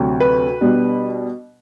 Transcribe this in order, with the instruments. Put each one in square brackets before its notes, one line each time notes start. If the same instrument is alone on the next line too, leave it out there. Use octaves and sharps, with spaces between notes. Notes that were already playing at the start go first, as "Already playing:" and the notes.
Already playing: [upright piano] D2 C3 F#3
B4
B2 G3 B3 D4